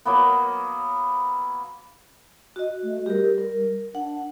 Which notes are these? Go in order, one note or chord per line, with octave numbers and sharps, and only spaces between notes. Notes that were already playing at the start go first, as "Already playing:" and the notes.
F#3 A#3 B3
F#4 D#5
A3
G3 G4 A#4
A#4
D4 F#5